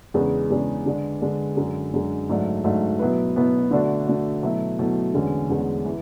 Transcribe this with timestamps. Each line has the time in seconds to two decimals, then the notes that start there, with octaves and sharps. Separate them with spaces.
0.14 E2 C#3 G#3 D4 G#4
0.50 E2 C#3 G#3 D4 G#4
0.86 D3 G#3 D4
1.22 D3 G#3 D4
1.56 F#2 D3 G#3
1.93 F#2 D3 G#3
2.29 G#2 F#3 A3 D4
2.64 G#2 F#3 A3 D4
2.99 B2 F#3 B3 E4 B4
3.36 B2 F#3 B3 E4 B4
3.71 D3 A3 D4 F#4
4.06 D3 A3 D4 F#4
4.43 B2 F#3 A3 E4
4.79 B2 F#3 A3 E4
5.14 E2 D3 G#3 C#4
5.50 E2 D3 G#3 C#4
5.85 E3